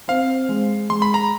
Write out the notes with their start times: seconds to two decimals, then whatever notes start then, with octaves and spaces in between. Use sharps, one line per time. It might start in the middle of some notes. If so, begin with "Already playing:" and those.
0.08 C4 F5
0.49 G#3
0.89 G#3 C6
1.02 B5
1.14 A#5